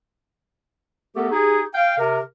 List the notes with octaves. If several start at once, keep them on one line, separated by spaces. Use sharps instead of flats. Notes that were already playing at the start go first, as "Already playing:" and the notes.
A3 B3 G4 A4 A#4
D#4 G4 G#4
F5 G5
C3 A#4